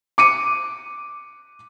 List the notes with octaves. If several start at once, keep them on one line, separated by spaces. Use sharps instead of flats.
D6 C#7 D#7